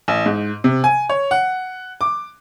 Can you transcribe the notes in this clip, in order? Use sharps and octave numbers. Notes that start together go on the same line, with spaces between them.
A1
G#2
C3
G#5
C#5
F#5
D6